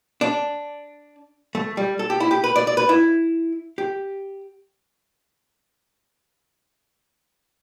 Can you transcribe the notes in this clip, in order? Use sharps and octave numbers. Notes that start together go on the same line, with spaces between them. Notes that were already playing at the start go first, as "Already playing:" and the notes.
D4
A3
G3
A4
G4
E4
G4
B4
D5
D5
B4
E4
G4